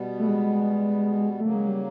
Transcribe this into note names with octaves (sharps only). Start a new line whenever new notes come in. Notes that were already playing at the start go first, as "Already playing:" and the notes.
Already playing: B2 G3 B3
A3
G#3
C#3 F#3 A3 A#3
G#3
G3